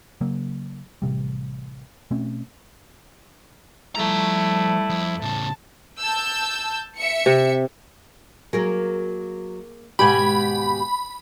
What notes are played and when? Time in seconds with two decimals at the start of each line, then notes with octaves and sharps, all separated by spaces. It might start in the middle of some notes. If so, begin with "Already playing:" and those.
0.21 C#3 F#3 A#3
1.02 A1 C3 G3
2.11 B2 A3 C4 C#4
3.95 F3 G3 A3 E4 A#5
4.90 F2
5.22 A2 C#3 A5
6.00 A5 E6 G6
6.96 E5 C#7
7.26 C3
8.53 F#3 A#3 G#4 A#4
9.99 D#2 G#2 B2 G4 G#5 B5